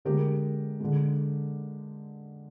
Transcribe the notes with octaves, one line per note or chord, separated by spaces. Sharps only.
D3 G#3 G4 A#4
D3 G#3